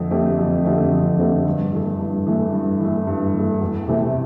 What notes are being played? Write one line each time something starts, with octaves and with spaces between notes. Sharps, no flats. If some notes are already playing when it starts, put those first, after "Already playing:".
Already playing: F2 D3 A3 C4
D3 A3 C4 G4
F2
D3 A3 C4 G4
F2
D3 A3 C4 G4
G2
E3 A3
G2
E3 A3
G2
E3 A3
G2
E3 A3
E2
C3 E3 A3 C4